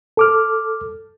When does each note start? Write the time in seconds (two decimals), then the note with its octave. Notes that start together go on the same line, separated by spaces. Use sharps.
0.17 A4 D6 F6